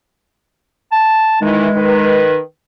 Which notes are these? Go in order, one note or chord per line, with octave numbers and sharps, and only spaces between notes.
A5
D#3 E3 G#3
D#3 B4